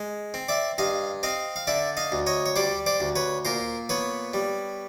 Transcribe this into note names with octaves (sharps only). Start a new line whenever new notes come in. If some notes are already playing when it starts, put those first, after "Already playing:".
Already playing: G#3
C4
D5 E5
G2 D#5 F5
C4 D#5 F5
F5
D3 D5 E5
D#5 F5
D2
C#5 D#5
C#5
G3 C5 D5
C5 D5
D2
B4 C#5
A#2 A#4 C5
B3 B4 C#5
G3